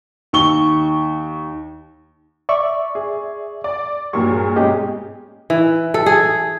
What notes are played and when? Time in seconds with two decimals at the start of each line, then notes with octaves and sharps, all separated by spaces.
0.33 D#2 C#6 G7
2.49 D5 E5 C#6
2.95 G#4
3.64 D5
4.13 G2 A#2 F#3 C#6
4.31 G#4
4.56 G#2 B2 C#4 G4 G#4 D#5
5.50 E3
5.94 A4
6.06 G#4